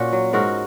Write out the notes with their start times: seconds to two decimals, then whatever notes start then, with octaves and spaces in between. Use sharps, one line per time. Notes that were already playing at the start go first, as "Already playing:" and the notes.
Already playing: A#2 C#4 F#4
0.13 F#3
0.33 G#2 F#4 A#4